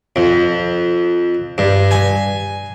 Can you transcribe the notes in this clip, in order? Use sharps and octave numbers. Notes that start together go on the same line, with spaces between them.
F2
G2
G#5